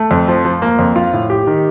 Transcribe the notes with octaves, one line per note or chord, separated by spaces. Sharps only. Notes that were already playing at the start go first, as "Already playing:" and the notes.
Already playing: A3
F2
F3
F3
A#3
F2
F4
A2
G4
D#3